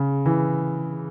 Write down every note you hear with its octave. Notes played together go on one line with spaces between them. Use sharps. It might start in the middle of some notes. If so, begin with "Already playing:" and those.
Already playing: C#3
E3